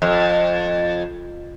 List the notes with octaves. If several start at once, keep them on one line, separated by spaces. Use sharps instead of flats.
F2